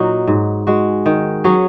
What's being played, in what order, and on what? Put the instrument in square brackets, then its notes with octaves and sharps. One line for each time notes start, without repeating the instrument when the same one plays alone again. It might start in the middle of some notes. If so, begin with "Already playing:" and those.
Already playing: [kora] A#2 F#3 D#4 F#4
G#2
G#3 F#4
D#3
F#3 C#4 G#4